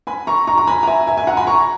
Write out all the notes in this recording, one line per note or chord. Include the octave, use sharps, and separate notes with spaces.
G#5 B5
A#5 C#6
A#5 C#6
A#5
G#5 B5
A#5
E5 G#5
E5 G#5
E5 G#5
F#5 A#5
G#5 B5
A#5 C#6